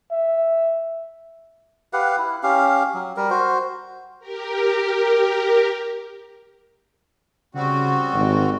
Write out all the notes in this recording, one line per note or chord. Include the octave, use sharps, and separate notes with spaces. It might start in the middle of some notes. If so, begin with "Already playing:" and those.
E5
G4 B4 F5 F#5
E4
C#4 G4 F5
F#3
G3 A#4
F#4 C5
G4 A#4
C#3 G3 C4 F#4
G#1